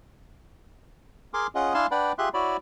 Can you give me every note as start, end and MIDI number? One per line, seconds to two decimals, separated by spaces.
1.34 1.47 68
1.34 1.47 70
1.34 1.47 80
1.34 1.47 84
1.34 1.47 86
1.55 1.74 61
1.55 1.74 65
1.55 1.74 68
1.55 1.74 75
1.55 1.74 78
1.74 1.87 62
1.74 1.87 64
1.74 1.87 77
1.74 1.87 80
1.74 1.87 81
1.74 1.87 84
1.91 2.12 62
1.91 2.12 71
1.91 2.12 74
1.91 2.12 78
1.91 2.12 79
1.91 2.12 83
2.18 2.29 65
2.18 2.29 67
2.18 2.29 68
2.18 2.29 76
2.18 2.29 84
2.18 2.29 90
2.34 2.57 64
2.34 2.57 66
2.34 2.57 73
2.34 2.57 74
2.34 2.57 83